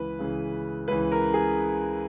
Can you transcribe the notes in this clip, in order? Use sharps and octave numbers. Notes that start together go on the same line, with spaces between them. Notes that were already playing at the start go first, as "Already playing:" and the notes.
Already playing: C#2 C#3 E3 B4
C#2 C#3 E3
C#2 C#3 E3 B4
A#4
G#4